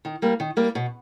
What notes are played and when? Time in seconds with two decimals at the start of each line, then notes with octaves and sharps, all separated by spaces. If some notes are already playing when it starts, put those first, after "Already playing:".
0.05 D#3
0.22 G3 A#3
0.40 D#3
0.57 G3 A#3
0.75 B2